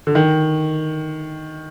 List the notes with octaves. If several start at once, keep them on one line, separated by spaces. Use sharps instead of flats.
D3
D#3